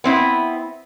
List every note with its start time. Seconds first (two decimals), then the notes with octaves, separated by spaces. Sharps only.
0.04 B3 C4 E4